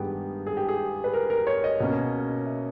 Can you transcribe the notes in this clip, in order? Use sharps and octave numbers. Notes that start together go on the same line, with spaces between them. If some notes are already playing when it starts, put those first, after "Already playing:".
Already playing: G2 D#3 G#3 B3 G4 G#4
G#4
G4
G#4
B4
A#4
A#4
C#5
D#5
B2 A#3 C#4
E5